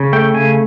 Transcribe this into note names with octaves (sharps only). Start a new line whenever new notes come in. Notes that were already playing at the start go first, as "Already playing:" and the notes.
Already playing: C#3
A3 G5
C#3 G#5